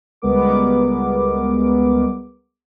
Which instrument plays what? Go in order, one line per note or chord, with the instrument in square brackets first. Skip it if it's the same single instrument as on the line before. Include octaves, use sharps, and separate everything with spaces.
[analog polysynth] C#2 G3 G#3 B3 A#4 D6